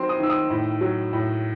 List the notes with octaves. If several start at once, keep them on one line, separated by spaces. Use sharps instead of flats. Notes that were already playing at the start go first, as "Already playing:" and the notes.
Already playing: D#3 F#3 C4 C6
D#6
D#3 E6
D#6
A2
F#3
A2